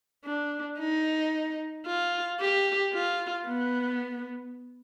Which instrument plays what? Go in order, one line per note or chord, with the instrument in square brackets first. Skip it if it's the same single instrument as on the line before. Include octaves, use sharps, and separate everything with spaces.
[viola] D4
D#4
F4
G4
F4
B3